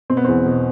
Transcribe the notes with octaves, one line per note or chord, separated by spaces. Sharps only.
B2 C4
B3
E2 C4
B2